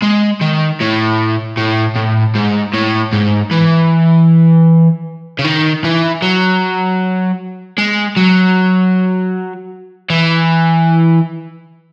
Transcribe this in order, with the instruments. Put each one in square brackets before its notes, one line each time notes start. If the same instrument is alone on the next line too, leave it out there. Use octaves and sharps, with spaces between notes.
[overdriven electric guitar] G#3
D#3
A2
A2
A2
G#2
A2
G#2
E3
C#3
D#3
E3
F#3
G#3
F#3
E3